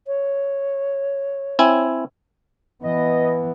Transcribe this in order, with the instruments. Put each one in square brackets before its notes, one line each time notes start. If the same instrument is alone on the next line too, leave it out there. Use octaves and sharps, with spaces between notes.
[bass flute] C#5
[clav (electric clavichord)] C4 E4 G#5
[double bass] E3 B3 [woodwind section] D#5